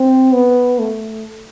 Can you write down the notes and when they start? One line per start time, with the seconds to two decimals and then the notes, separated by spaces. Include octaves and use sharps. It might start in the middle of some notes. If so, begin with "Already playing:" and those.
Already playing: C4
0.33 B3
0.79 A3